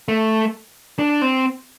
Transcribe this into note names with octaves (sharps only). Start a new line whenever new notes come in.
A3
D4
C4